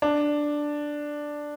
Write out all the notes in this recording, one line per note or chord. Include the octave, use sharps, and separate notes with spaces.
D4